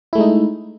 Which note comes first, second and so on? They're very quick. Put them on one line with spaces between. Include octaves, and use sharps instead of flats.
E4 A3 G#3 D#4